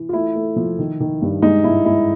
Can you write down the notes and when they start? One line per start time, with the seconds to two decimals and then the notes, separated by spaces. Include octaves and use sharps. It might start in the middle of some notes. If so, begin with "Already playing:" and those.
Already playing: E3
0.09 F4
0.13 A3 E4
0.35 A3
0.56 F3
0.79 D#3
1.00 D#3
1.22 G2
1.42 G#3 D#4
1.64 G#2 E4
1.85 G#3 E4